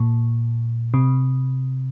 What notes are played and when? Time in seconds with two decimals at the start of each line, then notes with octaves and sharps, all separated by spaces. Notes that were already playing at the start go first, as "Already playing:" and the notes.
Already playing: A#2
0.94 C3